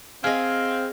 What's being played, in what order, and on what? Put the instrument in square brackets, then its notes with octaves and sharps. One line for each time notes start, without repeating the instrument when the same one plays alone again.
[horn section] C4 [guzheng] G#4 D#5 [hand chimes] F5 [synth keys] F6